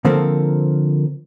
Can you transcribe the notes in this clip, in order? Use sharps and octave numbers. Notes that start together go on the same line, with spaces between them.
D3 F3 A#3 C4 A4 A#4